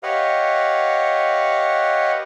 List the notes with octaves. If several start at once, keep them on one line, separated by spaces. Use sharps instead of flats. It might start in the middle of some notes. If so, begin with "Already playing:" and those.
G4 B4 C#5 D#5 F5 F#5